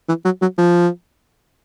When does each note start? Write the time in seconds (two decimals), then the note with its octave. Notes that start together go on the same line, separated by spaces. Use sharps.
0.08 E3
0.25 F#3
0.42 F#3
0.58 F3